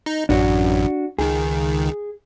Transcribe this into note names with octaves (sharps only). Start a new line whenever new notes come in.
D#4
A1 F#2 D4 F#4
C#2 D#3 G#4